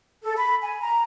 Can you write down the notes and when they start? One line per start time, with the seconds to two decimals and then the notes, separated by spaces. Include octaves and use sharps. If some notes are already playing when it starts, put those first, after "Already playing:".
0.23 A4
0.37 B5
0.62 G#5
0.80 A#5